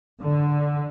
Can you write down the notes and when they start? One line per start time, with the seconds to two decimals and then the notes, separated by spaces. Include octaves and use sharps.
0.21 D3